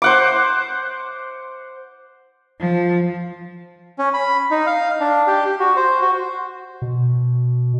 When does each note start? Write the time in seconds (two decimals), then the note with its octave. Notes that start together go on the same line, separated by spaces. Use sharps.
0.02 C5 F#5 D6
2.60 F3
3.99 C#4
4.14 B5
4.51 D#4
4.66 F5
5.00 D4
5.27 G4
5.45 G4
5.60 F#4
5.76 C5
6.01 F#4
6.82 B2